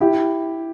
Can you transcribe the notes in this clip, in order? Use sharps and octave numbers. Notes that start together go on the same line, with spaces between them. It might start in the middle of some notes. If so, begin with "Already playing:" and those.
E4 G4